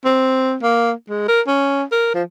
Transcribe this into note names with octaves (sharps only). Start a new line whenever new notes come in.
C4
A#3
G#3
A#4
C#4
A#4
F3